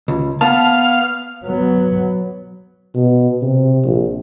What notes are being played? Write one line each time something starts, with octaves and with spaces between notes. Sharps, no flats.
C#2
B3 F5 A5
F#3 B3
B2
C3
A#1